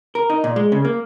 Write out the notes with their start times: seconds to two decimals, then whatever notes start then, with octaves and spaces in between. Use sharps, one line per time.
0.15 A#4
0.30 D#4
0.44 A#2
0.56 G#3
0.72 C#3
0.85 A#3